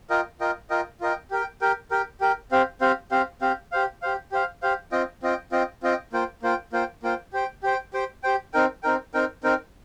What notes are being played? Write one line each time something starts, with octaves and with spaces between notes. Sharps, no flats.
F4 A#4 D#5 G5
F4 A#4 D#5 G5
F4 A#4 D#5 G5
F4 A#4 D#5 G5
G4 A#4 G5
G4 A#4 G5
G4 A#4 G5
G4 A#4 G5
C4 G4 C5 F5
C4 G4 C5 F5
C4 G4 C5 F5
C4 G4 C5 F5
G4 C5 F5
G4 C5 F5
G4 C5 F5
G4 C5 F5
C4 F4 D#5 G5
C4 F4 D#5 G5
C4 F4 D#5 G5
C4 F4 D#5 G5
A#3 F4 C5 G5
A#3 F4 C5 G5
A#3 F4 C5 G5
A#3 F4 C5 G5
G4 C5 G5
G4 C5 G5
G4 C5 G5
G4 C5 G5
C4 D#4 A#4 G5
C4 D#4 A#4 G5
C4 D#4 A#4 G5
C4 D#4 A#4 G5